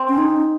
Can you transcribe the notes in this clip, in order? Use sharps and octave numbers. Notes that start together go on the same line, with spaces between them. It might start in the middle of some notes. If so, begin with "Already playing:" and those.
Already playing: C4
C#4
D#4